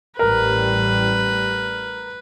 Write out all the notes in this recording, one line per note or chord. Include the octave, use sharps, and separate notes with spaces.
A1 G3 A#4 B4